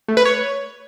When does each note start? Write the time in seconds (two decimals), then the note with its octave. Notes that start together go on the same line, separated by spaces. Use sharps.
0.08 A3
0.17 B4
0.25 C#5